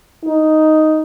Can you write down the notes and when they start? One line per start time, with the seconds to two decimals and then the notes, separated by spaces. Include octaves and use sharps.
0.24 D#4